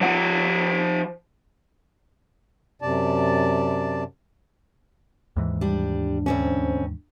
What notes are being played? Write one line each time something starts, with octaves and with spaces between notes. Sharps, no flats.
F3 F#5
F#2 C3 D5 A5
D#2 G#2 E3
G3 D4
D2 C4 C#4